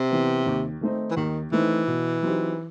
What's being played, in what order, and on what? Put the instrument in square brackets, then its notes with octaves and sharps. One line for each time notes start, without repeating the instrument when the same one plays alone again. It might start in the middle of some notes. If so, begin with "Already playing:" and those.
Already playing: [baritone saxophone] C3
[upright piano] E3 B3
D#2
D#3 A3 C4 D#4
[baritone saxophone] E3
[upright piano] D#2 [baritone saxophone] D#3
[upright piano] D#3 A3 C4 D#4 [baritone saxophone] E3
[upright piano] B2
F#3 C4 D#4 G4